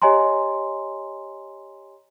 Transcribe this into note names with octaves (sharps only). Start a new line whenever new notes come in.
G4 C#5 D#5 G#5 A#5 C6